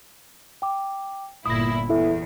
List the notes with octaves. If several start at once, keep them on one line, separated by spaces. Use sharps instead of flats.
G5 D6
G1 A#2 E4 D#6 A#6
E2 E4 A4 E5